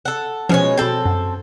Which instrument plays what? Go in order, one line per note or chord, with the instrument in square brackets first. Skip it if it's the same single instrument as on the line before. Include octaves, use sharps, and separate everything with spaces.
[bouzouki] A4 F#5
[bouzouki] B2 G#3 C#5 [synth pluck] F3 C#4
[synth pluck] B2 G6 [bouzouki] C4 A4
[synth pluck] F#2